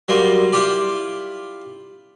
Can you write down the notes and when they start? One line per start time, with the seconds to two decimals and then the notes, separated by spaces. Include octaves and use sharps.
0.08 F#3 G3 A#3 C6
0.52 E4 F4 G4 D5